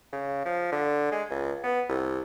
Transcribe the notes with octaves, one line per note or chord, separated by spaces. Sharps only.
C#3
F3
D3
G#3
C#2
B3
C2